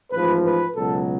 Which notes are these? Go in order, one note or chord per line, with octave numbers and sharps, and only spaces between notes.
A1 G#2 F3 B4
B4
C#2 B2 F#3 A4